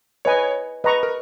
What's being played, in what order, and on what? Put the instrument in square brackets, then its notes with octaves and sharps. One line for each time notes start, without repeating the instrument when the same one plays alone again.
[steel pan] B4 D#5 G#5 [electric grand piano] C#5
[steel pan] B4 D#5 A#5 C#6
[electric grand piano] A#4